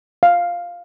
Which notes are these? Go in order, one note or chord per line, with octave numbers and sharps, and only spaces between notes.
F5